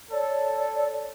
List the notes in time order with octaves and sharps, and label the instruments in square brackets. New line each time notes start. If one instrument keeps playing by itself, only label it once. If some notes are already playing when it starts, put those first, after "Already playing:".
[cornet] A4 [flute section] C#5 D5